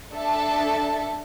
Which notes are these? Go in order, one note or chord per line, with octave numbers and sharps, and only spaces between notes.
D4 A4 E5 A5